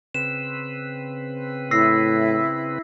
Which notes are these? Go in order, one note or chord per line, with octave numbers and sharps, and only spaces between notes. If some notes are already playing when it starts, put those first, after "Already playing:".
C#3 C4 B4 E7
A2 E4 E6 A#6 C7